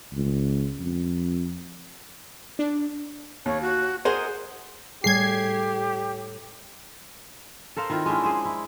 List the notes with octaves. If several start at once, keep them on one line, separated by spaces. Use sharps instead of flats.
C#2
F2
D4
D#2 C#5
F#4
G#4 A#4 C5 D#5 F#5
A2 G3 G4 G#4 G#6 C7
A4 A#4 C5 F5
D#3 C4 E4 F4
G#3 C#4 D4 E4
G#4 C5
E4